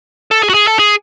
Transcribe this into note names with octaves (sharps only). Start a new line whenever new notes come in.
A4
G#4
F#4
G#4
A4
G#4